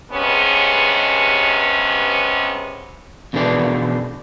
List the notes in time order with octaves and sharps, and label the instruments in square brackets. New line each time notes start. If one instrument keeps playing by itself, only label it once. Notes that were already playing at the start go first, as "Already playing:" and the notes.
[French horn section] G2 C3 G#3 B3 C#4
[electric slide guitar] F2 B2 D3 E3 G#4 D5